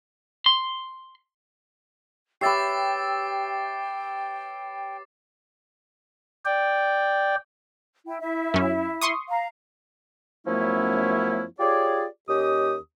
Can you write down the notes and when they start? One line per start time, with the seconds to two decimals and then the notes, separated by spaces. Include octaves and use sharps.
0.46 C6
2.41 G4 B4 C#5 E5 G5 D6 A6 C7
6.45 D5 G5
8.06 E4 G5
8.21 E4 E5
8.54 F#2 C#4
9.01 C6 C#6 D#6
9.29 F5 A#5
10.47 F#2 F3 A3 B3 C#4 E4
11.60 F4 G4 G#4 C#5 D5
12.29 D#2 C#4 G4 D#5 D#6